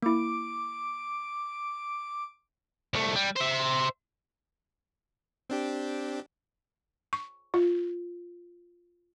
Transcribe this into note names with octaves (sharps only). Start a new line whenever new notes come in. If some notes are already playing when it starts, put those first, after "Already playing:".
A#3 E4 D6
C2 A3
G3
C5 E5
C4 D4 G4
C#6
F4